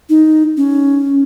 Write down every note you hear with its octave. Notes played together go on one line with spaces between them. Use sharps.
D#4
C#4